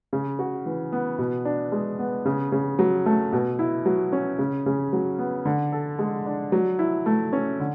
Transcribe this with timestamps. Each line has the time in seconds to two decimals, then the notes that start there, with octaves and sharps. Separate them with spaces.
0.13 C#3
0.39 F#4
0.66 E3
0.93 B3
1.19 B2
1.45 D4
1.72 G#3
1.99 B3
2.25 C#3
2.52 C#3
2.79 F#3
3.06 A3
3.33 B2
3.59 E4
3.86 F#3
4.13 C#4
4.39 C#3
4.66 C#3
4.93 F#3
5.19 B3
5.45 D3
5.72 A4
5.99 G#3
6.26 D4
6.52 F#3
6.79 E4
7.06 A3
7.33 C#4
7.60 D3